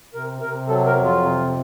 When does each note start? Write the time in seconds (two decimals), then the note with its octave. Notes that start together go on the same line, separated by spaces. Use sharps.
0.14 C3 A#4
0.41 C3 A#4
0.68 F#3 A4
0.87 A#4
0.96 F2
1.05 F4
1.23 C3